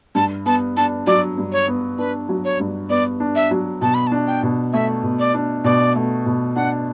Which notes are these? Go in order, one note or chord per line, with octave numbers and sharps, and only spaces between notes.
G2 A5
B3 A5
D4 A5
F#3 D5
G2
C#5
B3
D4 B4
F#3
C#5
G2
B3 D5
D4
E5
F#3
B2 A5
B5
A5
D4
G5
B2
A3 E5
B2
D5
D4
B2 D5
A3
B2
D4 F#5